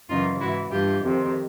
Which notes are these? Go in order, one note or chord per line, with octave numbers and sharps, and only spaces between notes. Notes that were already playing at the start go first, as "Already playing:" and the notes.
F#2 C#3 E3 D#4 F4
G#2 E3 E4 F#4
G2 E3 F4 G4
F2 C3 D#3